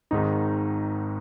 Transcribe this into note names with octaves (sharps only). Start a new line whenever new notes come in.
G#1 G#2 D#3 D#4